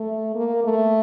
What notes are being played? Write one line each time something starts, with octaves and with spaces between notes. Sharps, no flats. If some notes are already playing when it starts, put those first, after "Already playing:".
Already playing: A3
A#3
A3